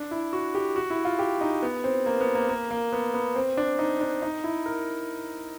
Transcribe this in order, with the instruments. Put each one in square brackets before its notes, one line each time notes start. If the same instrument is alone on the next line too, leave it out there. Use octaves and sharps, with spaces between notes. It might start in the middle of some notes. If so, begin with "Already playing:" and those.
Already playing: [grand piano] D4
E4
F#4
G4
F#4
E4
F4
G4
D#4
B3
C4
A#3
B3
A#3
A#3
A#3
B3
B3
C4
D4
D#4
D4
D#4
E4
A#4